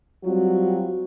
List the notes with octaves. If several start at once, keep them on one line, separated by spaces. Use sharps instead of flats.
F#3 G3 C4 F4 F#4